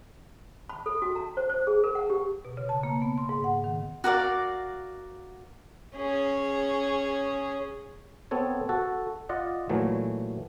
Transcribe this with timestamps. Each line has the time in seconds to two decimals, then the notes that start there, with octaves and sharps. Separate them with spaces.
0.69 B5
0.86 A4
1.02 F#4
1.15 A#5
1.37 C5
1.50 C5
1.67 G#4
1.84 A#4
1.95 F#5
2.10 G4
2.45 B2
2.57 C#3
2.69 A5
2.83 A#3
3.02 B3
3.18 C6
3.29 G#2
3.44 F#5
3.64 D#3
4.04 F#4 A#4 D5 F5
5.96 C#4 G#4
8.31 B3 C4 A4 C#5
8.69 F#4 A4
9.29 F4 D5 D#5 F#5
9.69 A#2 E3 F#3 A3